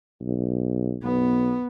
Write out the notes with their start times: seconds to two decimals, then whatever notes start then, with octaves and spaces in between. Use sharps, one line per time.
0.21 B1
1.03 B1 B3